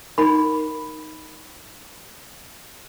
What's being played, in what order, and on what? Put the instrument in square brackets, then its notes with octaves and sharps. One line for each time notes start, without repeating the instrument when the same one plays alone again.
[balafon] D#4 A#4 [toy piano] B5